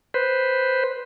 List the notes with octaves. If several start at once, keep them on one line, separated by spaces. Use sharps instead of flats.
B4 C5